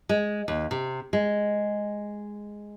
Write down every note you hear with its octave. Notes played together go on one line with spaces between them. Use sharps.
G#3
D#2
C3
G#3